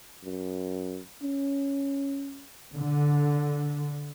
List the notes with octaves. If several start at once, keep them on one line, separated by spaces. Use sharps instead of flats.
F#2
C#4
D3